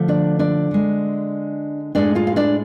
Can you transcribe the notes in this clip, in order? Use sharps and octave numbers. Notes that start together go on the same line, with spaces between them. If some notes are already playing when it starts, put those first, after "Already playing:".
Already playing: D3 F3 A3
D4 D5
D4 D5
D3 G#3
A2 G#3 D4 D5
F4 F5
F5
D4 D5